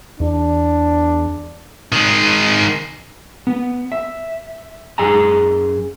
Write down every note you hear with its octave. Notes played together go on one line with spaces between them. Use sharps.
E2 D4
D#3 G#3
B3
E5
F#2 G#4 D#5 G#5 A#5